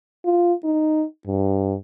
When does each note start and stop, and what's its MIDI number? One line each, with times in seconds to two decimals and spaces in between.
0.25 0.53 65
0.64 1.04 63
1.26 1.75 43